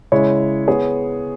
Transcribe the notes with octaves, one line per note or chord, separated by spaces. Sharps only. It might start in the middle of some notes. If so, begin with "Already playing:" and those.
C#3 G#3 E4 C#5
B3 G#4 C#5